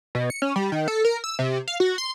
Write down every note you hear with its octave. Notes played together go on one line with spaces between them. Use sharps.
B2
C#7
C#4
G3
D#3
A4
A#4
E6
C3
F5
F#4
C6